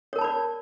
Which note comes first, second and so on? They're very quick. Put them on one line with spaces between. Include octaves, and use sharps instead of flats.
C#5 A#4 A5 B5 D5